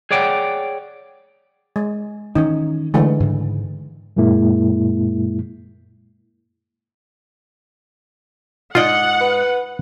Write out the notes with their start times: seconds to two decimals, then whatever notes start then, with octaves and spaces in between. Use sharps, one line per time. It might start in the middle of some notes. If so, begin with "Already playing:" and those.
0.11 G#4 C#5 D5 F#5 G5
1.76 G#3
2.35 D#3 E3 C#4 D#4
2.94 D3 E3 G#3 A3
3.20 G#2 C#3
4.16 F#2 A#2 G#3 A#3 E4
8.75 G#2 F4 D5 D#5 F#5
9.21 B4